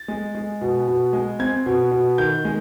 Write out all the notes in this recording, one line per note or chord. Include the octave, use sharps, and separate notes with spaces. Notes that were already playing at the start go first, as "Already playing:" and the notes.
Already playing: A6
G#3
G#3
B2
B2
G#3
C4 G#6
B2
B2
D#3 G6
G#3